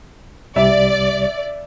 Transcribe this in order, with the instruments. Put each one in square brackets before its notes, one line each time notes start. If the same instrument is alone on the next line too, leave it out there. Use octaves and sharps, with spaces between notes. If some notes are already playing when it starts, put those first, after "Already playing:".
[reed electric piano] C2 C3 G3 [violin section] D5 [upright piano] E5